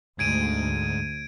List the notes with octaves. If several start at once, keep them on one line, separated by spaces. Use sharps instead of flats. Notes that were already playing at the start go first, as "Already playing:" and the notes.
D2 G#2 G#6 D7 D#7